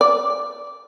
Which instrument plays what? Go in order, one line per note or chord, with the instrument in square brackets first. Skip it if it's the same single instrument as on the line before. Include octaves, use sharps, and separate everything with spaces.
[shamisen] D5